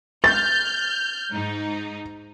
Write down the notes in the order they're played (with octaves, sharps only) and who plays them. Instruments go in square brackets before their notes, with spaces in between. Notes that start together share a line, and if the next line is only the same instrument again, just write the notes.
[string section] F6 G6 [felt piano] A6
[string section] G#2 D#4